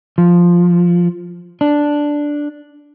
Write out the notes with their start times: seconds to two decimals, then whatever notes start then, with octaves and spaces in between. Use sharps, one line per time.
0.18 F3
1.61 D4